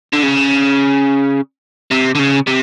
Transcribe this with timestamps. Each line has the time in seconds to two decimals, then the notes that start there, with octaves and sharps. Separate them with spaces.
0.13 D3
0.23 C#3
1.91 C3
2.15 D3
2.19 C#3
2.47 C3